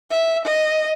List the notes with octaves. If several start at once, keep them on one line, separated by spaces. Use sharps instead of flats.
E5
D#5